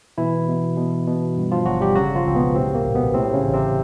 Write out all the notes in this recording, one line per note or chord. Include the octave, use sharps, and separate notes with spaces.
B2 E3 E4
B2
B2
B2
G2
F3 F4
G1 F#3 F#4
G3 G4
C#3 F#3 F#4
F3 F4
C#2 C4
B2 B3
A2 C3 C4
A#3
A#1
B2 B3
A2 C3 C4
C#3 C#4
A1
C3 C4